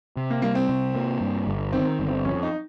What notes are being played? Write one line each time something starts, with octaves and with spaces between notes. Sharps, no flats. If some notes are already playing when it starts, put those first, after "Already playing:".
C3
A#3
G3 A#3
C4
C3
A#3
G2
G1
D#3 C4
C4
G1
C4
F2 C#4
D#4